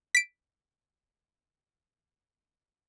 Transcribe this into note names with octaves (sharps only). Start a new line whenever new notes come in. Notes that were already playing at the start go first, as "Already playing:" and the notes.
B6 D7